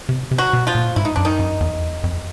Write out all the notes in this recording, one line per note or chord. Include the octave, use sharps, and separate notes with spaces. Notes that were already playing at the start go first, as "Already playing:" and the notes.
C3
C3
F#3 F#4
B2
F3 F4
A#2
G#2 E4
D#4
F#2 D4
D#3 D#4
F#2
E2
F2
E2
F2